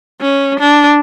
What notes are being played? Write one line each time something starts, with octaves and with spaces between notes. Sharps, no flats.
C#4
D4